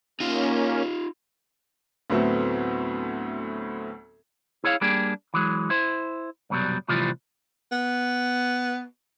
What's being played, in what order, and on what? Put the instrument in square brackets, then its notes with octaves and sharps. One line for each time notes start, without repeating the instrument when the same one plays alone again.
[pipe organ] A#3 C#4 [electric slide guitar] D#4 F4
[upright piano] D2 A2 F#3 B3 C4 E5
[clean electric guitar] E4 G#4 C#5 E5 F5
G3 A#3 D4 G4 G#4
E3 F#3 G#3
E4 C5
C2 F#2 B2 F#3 G3
A2 C3 E3 F3 G3 F4
[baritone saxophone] B3